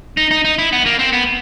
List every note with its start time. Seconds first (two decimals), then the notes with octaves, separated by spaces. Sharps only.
0.17 D#4
0.31 D#4
0.45 D#4
0.58 E4
0.73 B3
0.86 A#3
0.99 C4
1.13 B3